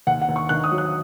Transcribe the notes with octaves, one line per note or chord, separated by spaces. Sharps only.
D#2 F#5
F#5
D#2
C#6
D#3 F#6
D#6
F#3
F#6